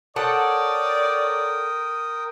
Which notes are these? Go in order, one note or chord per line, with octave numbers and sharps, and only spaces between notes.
A4 A#4 C#5 D5 F#5 G5 D#6